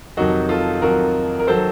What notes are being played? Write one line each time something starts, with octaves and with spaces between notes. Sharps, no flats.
F2 C3 D#3 F#3 D#4 F#4
F4 A4
F2 C3 D#3 F#3 F#4 A#4
A#4
D#3 F#3 A4 C5